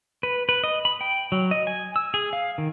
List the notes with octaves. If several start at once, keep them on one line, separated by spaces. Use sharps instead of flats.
B4
B4
D#5
B5
G5
F#3
D#5
G#5
E6
G#4
F5
D#3